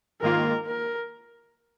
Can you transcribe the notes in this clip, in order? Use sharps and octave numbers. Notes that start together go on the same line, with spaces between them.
G#2 D#3 A#3 F4 A#4
A#4